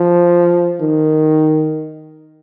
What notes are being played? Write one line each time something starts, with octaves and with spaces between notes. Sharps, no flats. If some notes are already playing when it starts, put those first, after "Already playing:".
Already playing: F3
D#3